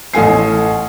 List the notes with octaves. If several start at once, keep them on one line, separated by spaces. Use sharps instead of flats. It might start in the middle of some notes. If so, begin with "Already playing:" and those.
A1 A4 G#5 C7